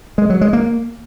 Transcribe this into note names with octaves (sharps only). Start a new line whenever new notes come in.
G#3
F#3
G#3
A#3